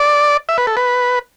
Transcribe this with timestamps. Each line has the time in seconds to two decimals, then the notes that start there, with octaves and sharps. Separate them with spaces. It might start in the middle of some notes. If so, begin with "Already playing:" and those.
Already playing: D5
0.49 E5
0.58 B4
0.67 A4
0.77 B4